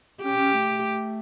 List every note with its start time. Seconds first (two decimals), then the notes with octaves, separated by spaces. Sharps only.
0.24 C#4 G4
0.38 C#4
0.53 A3